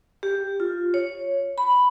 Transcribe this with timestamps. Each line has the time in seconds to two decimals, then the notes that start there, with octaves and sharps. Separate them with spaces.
0.23 G4
0.60 F4
0.94 C#5
1.58 B5